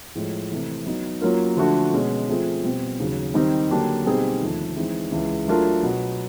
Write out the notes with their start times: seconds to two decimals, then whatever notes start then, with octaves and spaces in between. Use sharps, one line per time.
0.15 A2 F3 G#3
0.51 C3 E3 A3
0.86 F#3 B3 D#4
1.21 F#3 A#3 C#4 F4 A#4
1.57 D3 F3 A3 D4 F#4
1.93 B2 G#3 C#4
2.27 F3 A3 C4 F4 G#4
2.64 B2 G3 C4
2.99 D#2 C#3 F#3
3.34 D#3 G3 C4 D#4 G4
3.70 D3 F#3 A#3 D4 G4
4.05 B2 G3 C4 D#4 G#4
4.41 D#2 D3 F3 A3 D4
4.76 E3 G#3 C4 D#4
5.12 C#2 C#3 E3
5.48 F#3 A3 D4 F4 A#4
5.83 B2 F#3 B3